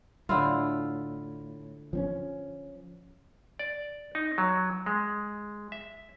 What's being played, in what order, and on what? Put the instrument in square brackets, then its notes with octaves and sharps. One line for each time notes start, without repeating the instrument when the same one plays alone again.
[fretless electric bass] A2 [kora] D3 E4 F4
[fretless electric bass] F3 C4 C#4
[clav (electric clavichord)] D5
D#4
F#3
G#3
E5